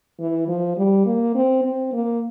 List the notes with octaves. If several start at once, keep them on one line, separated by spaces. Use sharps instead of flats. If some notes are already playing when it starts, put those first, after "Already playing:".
E3
F3
G3
A#3
C4
C4
A#3